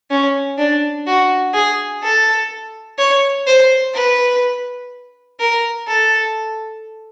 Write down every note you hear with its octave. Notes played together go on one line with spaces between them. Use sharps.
C#4
D4
F#4
G#4
A4
C#5
C5
B4
A#4
A4